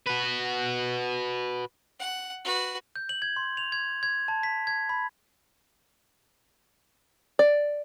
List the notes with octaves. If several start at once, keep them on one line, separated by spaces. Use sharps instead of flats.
F#4 B4
F#5
F#4 B4
G6
F#7
G#6
C6
F7
G#6
G#6
A5
B6
G#6
B5
D5